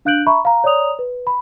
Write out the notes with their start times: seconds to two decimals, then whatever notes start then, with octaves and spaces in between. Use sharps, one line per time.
0.05 D4 F5 F#6 G6 D7 F#7
0.27 E5 A#5 B5 C#6
0.45 F5 A#5
0.64 C#5 D5 A#5 D#6 F7
0.99 B4
1.27 B5